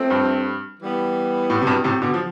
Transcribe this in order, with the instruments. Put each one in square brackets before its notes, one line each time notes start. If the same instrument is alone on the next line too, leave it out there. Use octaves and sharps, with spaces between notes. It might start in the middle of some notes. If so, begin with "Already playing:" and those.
Already playing: [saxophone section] F3 A3 C4
[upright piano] G2
[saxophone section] E3 G3 B3
[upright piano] A2
C3
G2 B2
A2 C3
B2 D3
F3